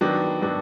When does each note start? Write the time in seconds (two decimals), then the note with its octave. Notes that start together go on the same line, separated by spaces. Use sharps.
0.01 D#3 F#3 B3 D4
0.41 D#3 F#3 B3 D4